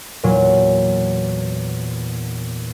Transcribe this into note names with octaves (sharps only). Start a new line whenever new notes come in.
E2 A#2 F#3